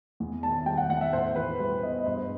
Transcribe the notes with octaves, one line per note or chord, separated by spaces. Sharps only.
E2
D#3 A5
A5
G3 G5
F#5
E2 F#5
E5
A2 C5
E3 B4
G3 C5
B3 D#5
D#5
G2 C5
C5